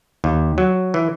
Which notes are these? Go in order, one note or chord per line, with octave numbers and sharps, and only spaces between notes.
D#2
F#3
E3